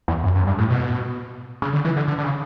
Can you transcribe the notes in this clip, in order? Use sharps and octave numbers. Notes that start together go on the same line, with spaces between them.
E2
F#2
F#2
G2
A2
B2
C#3
D3
E3
D3
D3
D3
C#3